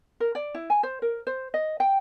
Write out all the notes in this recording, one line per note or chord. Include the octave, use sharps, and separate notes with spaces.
A#4
D5
E4
G#5
C5
A#4
C5
D#5
G5